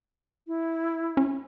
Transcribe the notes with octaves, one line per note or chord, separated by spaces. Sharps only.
E4
C#4